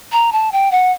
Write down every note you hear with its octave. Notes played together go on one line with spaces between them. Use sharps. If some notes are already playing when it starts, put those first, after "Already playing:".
A#5
A5
G5
F#5